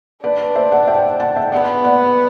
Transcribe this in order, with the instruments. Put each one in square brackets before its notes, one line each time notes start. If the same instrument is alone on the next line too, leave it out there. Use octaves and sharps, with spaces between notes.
[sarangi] D4 [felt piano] B4 D5
[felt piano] C5 E5
D5 F#5
E5 G5
F#5 A5
E5 G5
[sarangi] B3 [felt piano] D5 F#5
[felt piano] D5 F#5